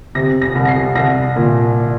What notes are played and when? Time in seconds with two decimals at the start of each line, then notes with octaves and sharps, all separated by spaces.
0.15 C3 A#6
0.42 A#6
0.55 C2
0.65 A#6
0.68 C7
0.95 C2 A#6
1.36 A#2